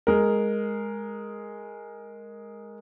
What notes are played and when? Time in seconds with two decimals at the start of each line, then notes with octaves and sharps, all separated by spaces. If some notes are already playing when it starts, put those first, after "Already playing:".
0.07 G#3 A#4